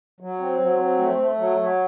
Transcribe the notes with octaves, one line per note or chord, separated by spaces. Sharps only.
F#3
C4
F#3
C4
A3
A3
F#3
F#3